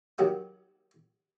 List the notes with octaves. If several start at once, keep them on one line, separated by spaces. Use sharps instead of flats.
D#3 F#3 G4 F#5 D#6